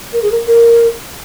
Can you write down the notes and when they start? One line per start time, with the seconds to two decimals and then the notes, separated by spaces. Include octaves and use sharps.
0.13 A#4
0.23 G#4
0.32 A#4
0.47 A#4